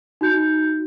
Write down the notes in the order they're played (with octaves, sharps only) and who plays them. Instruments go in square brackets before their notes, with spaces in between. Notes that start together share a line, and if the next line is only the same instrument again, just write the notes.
[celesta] D#4 F#4 G6